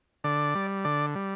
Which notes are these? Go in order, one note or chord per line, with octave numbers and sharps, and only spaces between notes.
D3 D5
G3
D3 D5
G3